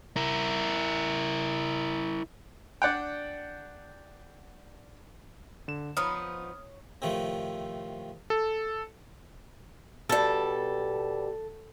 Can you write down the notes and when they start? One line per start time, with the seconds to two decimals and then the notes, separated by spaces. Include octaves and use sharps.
0.16 E4 A#4
2.82 D4 D5 F#5 G5
5.68 D3 E7
5.97 F3 B3 D#4 C#5 D#6 F6
7.02 A2 C3 D#3 F3 A3
8.30 A4
10.09 B2 G3 A4